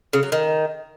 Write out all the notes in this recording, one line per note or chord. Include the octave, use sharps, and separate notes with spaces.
C#3
F#3
D#3